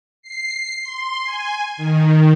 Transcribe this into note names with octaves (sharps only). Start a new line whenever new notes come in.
C7
C6
G#5
D#3